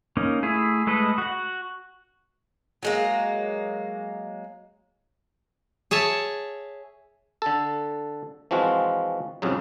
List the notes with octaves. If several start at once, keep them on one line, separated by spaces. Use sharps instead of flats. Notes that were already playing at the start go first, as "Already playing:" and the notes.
A#3 C#4 D#4
A3 E4 G#4
G#3 A3 A4 B4 D#5
F#4 F#5
F#3 G#3 A#3
G#4 C#5 E5 A5
D3 A4
E3 F3 G#3 C4 F4 F#4
C2 F2 G#2 C#3 F#3